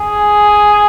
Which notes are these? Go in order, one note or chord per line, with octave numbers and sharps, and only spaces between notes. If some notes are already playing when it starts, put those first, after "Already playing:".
Already playing: G#4